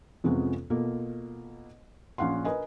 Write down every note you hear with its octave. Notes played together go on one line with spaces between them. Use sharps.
F2 C3 G#3 B3 C#4 F4
B2 A#3 F4 A4
A#1 C#4 F5 F#5 C6
A#4 B4 D#5 G#5